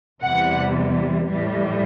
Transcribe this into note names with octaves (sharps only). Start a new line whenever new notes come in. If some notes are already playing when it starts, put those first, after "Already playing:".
E2 C3 E3 G3 F#5
A2 E3 G3